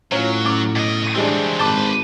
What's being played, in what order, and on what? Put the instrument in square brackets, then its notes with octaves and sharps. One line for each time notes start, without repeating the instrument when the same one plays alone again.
[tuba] A2 [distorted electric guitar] F#3 [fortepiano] C#4 F4
[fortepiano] F#2 D6
[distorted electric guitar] B2 D#5
[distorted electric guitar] E3 C4 [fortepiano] G3 G#3 D4
[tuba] G#1 [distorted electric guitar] B4 C5 [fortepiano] A5 D6